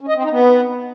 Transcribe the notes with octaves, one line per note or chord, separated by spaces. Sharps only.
C#4
D#5
C4
D#4
B3